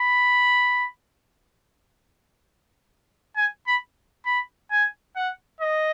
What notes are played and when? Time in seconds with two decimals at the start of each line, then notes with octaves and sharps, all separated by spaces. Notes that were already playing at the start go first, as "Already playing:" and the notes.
Already playing: B5
3.37 G#5
3.67 B5
4.26 B5
4.71 G#5
5.16 F#5
5.61 D#5